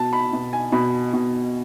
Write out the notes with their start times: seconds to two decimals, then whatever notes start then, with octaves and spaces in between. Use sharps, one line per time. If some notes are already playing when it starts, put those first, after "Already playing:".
Already playing: B2 A5
0.13 B5
0.33 B2
0.53 G#5
0.72 B2 B5
1.13 B2